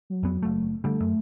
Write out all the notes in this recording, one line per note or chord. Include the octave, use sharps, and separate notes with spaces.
F#3
F2 B3
F#1 A3
D3 G3 A3
F#2